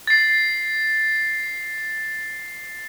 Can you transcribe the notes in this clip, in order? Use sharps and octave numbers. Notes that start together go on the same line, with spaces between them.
A6 C7